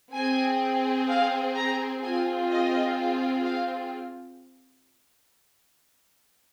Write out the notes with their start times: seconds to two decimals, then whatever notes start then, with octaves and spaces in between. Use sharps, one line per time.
0.14 C4 G#4 G#5
1.08 F5
1.55 A#5
2.02 C4 F4 G#4 G#5
2.49 D#5
3.44 F5